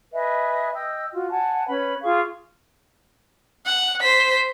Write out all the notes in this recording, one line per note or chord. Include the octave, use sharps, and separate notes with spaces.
B4 D#5 E5 G#5
D#5 G5 E6
F4 F#4
F#5 G#5 A5
C#4 B4 B5
F4 G#4 F5 C#6
F#5
C5 B6